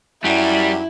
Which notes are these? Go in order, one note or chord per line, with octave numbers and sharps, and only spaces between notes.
F#2 G3 E4